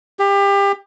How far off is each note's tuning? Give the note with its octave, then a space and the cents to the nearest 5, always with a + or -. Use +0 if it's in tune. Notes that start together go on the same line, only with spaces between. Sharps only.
G4 +30